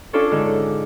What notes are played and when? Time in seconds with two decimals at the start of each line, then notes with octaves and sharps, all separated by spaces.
0.13 C#4 D4 F4 A4 C#5 D5
0.31 G#2 D3